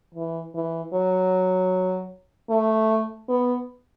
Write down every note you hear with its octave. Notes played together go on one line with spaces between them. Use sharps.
E3
E3
F#3
A3
B3